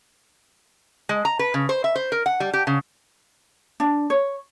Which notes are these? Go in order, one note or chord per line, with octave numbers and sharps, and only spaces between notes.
G#3
A#5
B4
C#3
C5
E5
C5
A#4
F#5
G3
G4
C#3
D4
C#5